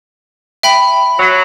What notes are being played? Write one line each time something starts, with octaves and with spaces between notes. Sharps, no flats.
E5 G5 B5
F#3